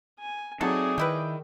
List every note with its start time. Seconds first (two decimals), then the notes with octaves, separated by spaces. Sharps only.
0.20 G#5
0.61 F#3 A3 C4 D#4 G#4 A4 D5
0.98 D#3 G#3 E4 B4 G5 E6